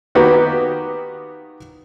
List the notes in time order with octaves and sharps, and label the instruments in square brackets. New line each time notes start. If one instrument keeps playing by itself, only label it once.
[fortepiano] D#3 A#3 B3 F#4 G4